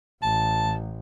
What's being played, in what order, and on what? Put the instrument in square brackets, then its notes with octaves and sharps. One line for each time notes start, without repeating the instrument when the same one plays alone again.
[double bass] A1 [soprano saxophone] A5